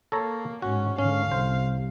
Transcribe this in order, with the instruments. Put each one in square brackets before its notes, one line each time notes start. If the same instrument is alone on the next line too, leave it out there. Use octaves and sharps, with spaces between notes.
[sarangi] A#3 [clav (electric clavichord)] A4 C#5 A#5
[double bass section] G#2 [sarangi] C#4 [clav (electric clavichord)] F#4
[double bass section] G#2 D3 [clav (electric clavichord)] C#4 [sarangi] F5
[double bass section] C2 [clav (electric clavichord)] C5